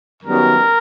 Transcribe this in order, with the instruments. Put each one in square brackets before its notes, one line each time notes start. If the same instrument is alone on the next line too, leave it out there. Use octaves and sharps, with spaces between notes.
[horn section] F#2 D#3 G3 B3 A#4